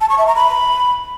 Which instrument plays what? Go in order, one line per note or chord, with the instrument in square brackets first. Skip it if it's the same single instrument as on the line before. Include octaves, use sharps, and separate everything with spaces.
[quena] A5
C#6
E5
A#5
B5